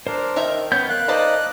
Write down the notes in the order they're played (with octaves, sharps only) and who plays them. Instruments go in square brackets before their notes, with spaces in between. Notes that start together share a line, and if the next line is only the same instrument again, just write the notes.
[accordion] D4 A#4 [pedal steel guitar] C5
[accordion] D#3 [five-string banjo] D#4 A#4 E5
[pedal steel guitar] B3 G6 [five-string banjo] C#4
[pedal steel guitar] A#4 F5 [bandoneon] F#6
[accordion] D#4 D5 D#5 [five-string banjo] C5 A5 B5